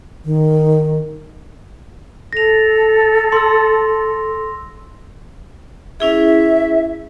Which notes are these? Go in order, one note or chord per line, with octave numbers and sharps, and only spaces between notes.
D#3
A4 A#6 F7
C6 E6
C#4 E4 G#4 E5